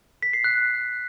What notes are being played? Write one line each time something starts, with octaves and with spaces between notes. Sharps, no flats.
B6
C7
F#6